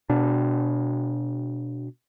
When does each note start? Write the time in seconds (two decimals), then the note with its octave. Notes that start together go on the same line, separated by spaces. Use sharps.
0.10 B2 D4